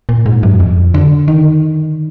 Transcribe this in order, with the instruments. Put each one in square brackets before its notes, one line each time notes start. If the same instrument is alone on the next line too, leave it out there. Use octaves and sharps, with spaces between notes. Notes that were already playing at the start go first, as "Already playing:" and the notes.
[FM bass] A#2
G#2
F#2
F2
D3
D#3